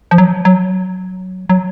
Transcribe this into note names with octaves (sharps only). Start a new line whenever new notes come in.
F3
F#3
F#3
F#3